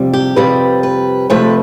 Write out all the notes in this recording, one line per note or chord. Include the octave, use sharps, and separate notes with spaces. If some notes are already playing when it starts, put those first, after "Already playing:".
Already playing: F2 C3 G3
G4
F2 C3 G3 B4
B4
F2 C3 F3 A3 B4